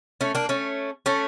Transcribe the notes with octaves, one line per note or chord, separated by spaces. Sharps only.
A3 C#4
A#3 D4
A3 C#4
A3 C#4